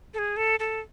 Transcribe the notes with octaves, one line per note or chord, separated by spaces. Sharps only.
A4
G#4
A4
A4